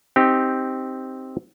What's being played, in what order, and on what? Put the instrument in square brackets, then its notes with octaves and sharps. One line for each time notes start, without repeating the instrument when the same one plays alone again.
[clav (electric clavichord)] C4 D#4 G4